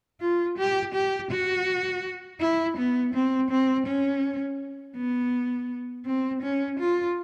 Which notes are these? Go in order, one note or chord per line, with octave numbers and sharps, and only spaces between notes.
F4
G4
G4
F#4
E4
B3
C4
C4
C#4
B3
C4
C#4
F4